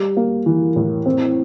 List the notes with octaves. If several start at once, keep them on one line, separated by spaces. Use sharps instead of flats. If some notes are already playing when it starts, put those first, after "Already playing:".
Already playing: G3
A#3
E3
A2
C4